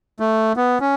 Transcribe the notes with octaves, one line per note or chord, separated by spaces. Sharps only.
A3
B3
C#4